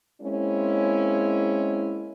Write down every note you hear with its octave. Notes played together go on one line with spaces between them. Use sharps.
G#3 A#3 C4 C#4 E4